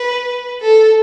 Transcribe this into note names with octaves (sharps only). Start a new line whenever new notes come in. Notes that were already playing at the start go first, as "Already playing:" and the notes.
Already playing: B4
A4